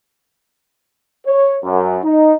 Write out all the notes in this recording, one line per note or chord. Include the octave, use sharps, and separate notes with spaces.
C#5
F#2
D#4